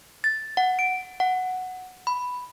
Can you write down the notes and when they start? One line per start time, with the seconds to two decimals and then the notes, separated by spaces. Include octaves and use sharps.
0.24 A6
0.57 F#5
0.79 D7
1.20 F#5
2.07 B5